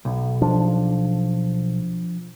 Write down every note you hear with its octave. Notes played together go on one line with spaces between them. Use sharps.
B1
F3 D4